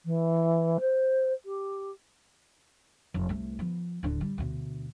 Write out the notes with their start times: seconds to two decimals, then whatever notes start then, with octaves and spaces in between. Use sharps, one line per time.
0.05 E3
0.80 C5
1.45 G4
3.14 F1
3.29 C2 A3
3.59 F3 B3
4.03 D1 D3
4.21 G3
4.38 D2 B2